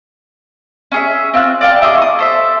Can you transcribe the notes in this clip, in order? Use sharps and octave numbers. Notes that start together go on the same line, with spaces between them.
C#4 G#4 E5
C4 F4 E6 F#6
D5 F5 G5 A5
E4 G#4 D#5 D6
C#6 D#6
A4 C5 E5